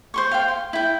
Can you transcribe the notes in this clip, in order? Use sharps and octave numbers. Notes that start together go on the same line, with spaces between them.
C5 C6 C#6
F5 G5
C6
E4 G5